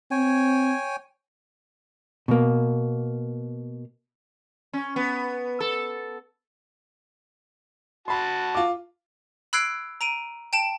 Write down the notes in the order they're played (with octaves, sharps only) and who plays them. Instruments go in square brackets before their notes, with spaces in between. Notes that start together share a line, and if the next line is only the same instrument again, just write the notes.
[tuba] C4 [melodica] C#5 G5 G#5
[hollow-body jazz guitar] B2 A#3
[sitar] C#4
B3
A4
[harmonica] F#4 A5 [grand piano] B5 C6
[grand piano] F4 D6
[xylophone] B5 E6 F#6 G#6 C7 D7
A#5 D7 D#7
G5 A5 D7 E7